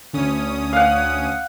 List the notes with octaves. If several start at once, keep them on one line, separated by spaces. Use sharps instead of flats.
D2 C#4 D#6
F5 F#5